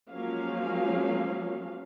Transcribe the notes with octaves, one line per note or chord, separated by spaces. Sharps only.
F3 F#3 G#3 A#3 C#4 F5